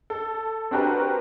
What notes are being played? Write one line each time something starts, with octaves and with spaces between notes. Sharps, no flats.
A4
C4 D4 F#4 G4 A#4 B4